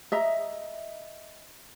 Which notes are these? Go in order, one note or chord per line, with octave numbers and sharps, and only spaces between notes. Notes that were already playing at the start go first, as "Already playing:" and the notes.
D#5 E5 A#5